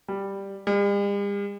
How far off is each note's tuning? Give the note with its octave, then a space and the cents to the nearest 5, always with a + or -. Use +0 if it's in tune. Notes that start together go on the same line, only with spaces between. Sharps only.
G3 +5
G3 +45